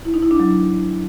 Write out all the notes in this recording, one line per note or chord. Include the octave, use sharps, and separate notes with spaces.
E4
D#4
E4
D4
F#3